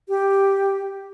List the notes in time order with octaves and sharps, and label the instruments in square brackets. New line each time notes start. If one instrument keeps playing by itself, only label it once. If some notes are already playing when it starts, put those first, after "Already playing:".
[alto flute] G4